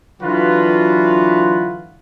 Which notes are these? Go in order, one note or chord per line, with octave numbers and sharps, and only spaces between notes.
D3 E3 F#3 F4 F#4 B4